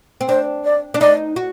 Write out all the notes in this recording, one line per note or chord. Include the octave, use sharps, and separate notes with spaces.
C4
D4 C5
D5
D4
D#4 D5
F#4